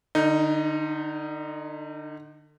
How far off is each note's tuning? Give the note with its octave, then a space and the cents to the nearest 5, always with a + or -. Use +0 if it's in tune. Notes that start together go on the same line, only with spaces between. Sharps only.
D3 +30 D#4 +0